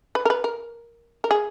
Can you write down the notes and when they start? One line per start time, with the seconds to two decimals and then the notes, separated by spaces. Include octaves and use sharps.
0.15 B4
0.25 A#4
0.30 B4
0.44 A#4
1.24 A#4
1.31 G#4